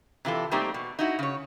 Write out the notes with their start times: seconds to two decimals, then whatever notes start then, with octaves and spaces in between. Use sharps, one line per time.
0.25 C3 E3 F4 A4
0.51 G3 A3 A#3 C4 D#4 G4
0.74 B2
0.99 D#4 E4 F#4
1.19 C#3 C#5